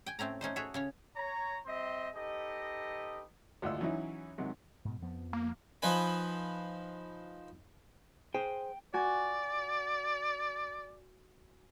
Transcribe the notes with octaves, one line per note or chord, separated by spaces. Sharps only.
G5 G#5
A2 A3 C4 C#4 A#5
A3 C#4 D#4 C5
F#4 G#4 A4 C#5 E5
C#3 C#4 C#5
C#5 A#5
G3 C4 C5 D#5 E5 C6
D#4 G4 A4 B4 D#5
G#1 D2 E4 F4 E6
E3 F#3 C#4 D#4 E4
G#2 C3 D#3 F#3
G#2 B2
F2 F3 B3
A#3
F3 D#4 B4 G#5
G#4 C5 G5
F#4 D5 G#5